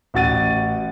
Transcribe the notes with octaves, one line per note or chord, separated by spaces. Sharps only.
A1 F#4 A6 D#7